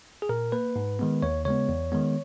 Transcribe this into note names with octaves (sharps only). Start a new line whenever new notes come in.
G#4
A#2 A#4
A#3 B4
G#2
D#3 G#3 B3
D#2 C#5
C#3 G#3 B3 C#5
E2
D#3 G#3 B3